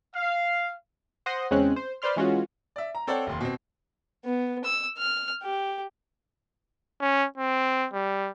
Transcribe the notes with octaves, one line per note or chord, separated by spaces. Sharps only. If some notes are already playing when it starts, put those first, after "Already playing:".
F5
C5 F#5 C6 D#6 A#6
E2 C#3 G#3 C4 C#4 F#6
C5
B4 C5 D5 C6 F6
E3 G#3 C#4 F4 F#4
D5 E5
A#5
C4 A4 C#5 D5 F#5 G5
F1 D#2 C6
B2 C4
B3
E6
F6
G4
C#4
C4
G3